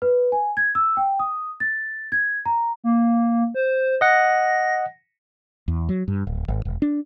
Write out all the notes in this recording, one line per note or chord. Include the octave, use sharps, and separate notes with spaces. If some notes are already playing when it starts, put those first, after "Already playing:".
B4
G#5
G#6
E6
G5
D#6
A6
G#6
A#5
A#3
C5
D#5 F#5 A#6
E2
F#3
G2
D1
G#1
E1
D4